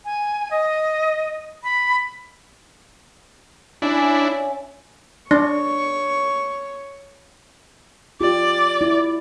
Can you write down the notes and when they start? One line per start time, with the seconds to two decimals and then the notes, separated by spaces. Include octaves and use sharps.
0.05 G#5
0.51 D#5
1.64 B5
3.82 C#4 D4 E4 E5 G#5
5.31 D4 C#5 C#6
8.21 F4 G4 D5
8.81 E4